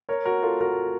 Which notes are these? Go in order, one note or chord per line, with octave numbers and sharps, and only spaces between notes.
A#4 C#5
F#4 A#4
F4 A4
F#4 A#4